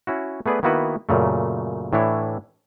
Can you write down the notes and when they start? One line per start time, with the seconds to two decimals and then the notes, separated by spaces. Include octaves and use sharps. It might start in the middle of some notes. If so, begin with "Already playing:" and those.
0.07 C#4 E4 F#4
0.46 A3 B3 G#4 B4 D5
0.63 D#3 A#3 B3 E4 F#4 B4
1.09 F#2 A#2 C#3 A3
1.93 A2 E3 D4 E4 C#5